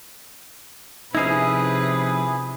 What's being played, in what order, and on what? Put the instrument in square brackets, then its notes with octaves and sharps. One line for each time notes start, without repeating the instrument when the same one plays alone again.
[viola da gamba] C3 B4 [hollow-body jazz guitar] F3 C#4 D#4 [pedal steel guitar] E4 G#4 [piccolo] D#6